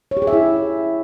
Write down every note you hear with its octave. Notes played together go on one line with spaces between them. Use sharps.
C#5
G4
G#4
E5
E4